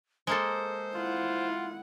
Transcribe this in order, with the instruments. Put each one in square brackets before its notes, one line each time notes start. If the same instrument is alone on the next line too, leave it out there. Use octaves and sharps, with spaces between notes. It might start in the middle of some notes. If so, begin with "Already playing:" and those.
[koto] G#3 A#3 A4 [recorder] C5
[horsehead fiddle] E4 F#5 [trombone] F4